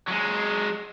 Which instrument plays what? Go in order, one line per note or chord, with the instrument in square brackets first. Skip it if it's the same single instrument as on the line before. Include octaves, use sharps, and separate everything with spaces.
[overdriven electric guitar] F#3 G#3